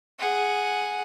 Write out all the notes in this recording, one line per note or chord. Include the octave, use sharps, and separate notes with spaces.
G#4 F#5